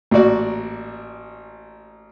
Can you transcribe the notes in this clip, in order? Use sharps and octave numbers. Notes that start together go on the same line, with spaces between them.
A1 A#2 F#4 D5